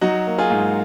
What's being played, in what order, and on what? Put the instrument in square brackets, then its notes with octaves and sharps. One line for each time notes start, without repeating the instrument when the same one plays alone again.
[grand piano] F#3 [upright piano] D#4 F#4
[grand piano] A#3
[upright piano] F4 G#4
[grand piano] G#2